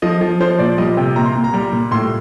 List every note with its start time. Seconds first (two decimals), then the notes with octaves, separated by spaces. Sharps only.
0.02 F3 D#5
0.21 F3
0.41 F3 C5
0.59 A#2 D5
0.78 G3 D#5
0.97 C3 G5
1.16 A#2 A#5
1.26 C6
1.35 A#2
1.44 A#5
1.54 G3
1.72 A#2
1.91 A2 C6